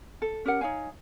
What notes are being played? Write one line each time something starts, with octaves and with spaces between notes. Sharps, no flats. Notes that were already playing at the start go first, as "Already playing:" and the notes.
A4
C#4 G4 A#4 F#5
D#4 C#5 F5 G#5